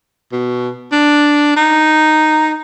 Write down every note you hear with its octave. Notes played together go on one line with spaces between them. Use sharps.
B2
D4
D#4